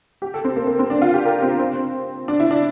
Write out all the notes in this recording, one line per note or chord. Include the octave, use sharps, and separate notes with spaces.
G4
A4
C4
A#3
A#3
C4
D4
F4
G4
A#4
C4
C4
D4
E4
D4